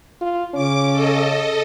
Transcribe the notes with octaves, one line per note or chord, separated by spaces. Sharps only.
F4
C#3 C#4 D6
A4 D#5